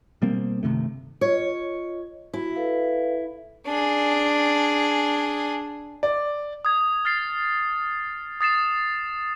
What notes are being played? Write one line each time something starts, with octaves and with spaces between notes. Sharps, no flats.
B2 G3 A#3 C4
G1 C3 D#3 A3
F4 C#5 D#5
E4 F#4
A4 B4 F5
D4 G#4
D5
D#6 G#6
F6 A6 C7
D#6 A6 C7 E7